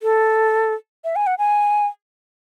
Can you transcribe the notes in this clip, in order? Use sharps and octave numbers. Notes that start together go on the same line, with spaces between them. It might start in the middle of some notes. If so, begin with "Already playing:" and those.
A4
E5
G#5
F#5
G#5